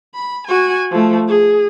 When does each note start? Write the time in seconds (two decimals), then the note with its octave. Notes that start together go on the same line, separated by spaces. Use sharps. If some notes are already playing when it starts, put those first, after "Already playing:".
0.15 B5
0.47 F#4 G#5
0.91 F3 A3
1.28 G#4